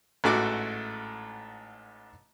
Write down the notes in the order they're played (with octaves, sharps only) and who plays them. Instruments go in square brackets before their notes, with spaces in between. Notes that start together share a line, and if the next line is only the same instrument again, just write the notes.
[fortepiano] A1 G#2 A3 F#4 D6